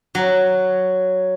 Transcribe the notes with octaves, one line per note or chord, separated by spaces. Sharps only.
F#3